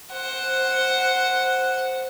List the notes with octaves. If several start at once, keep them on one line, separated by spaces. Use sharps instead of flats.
C5 F#5